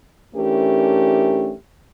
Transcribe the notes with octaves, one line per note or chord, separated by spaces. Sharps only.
E3 A3 C#4 D4 G4 A#4